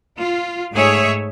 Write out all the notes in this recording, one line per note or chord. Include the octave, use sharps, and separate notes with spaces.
F4
G#2 A3 G#4 C#5 E5